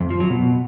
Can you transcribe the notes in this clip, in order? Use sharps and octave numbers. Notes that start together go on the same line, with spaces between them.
F2
F3
F#3
B2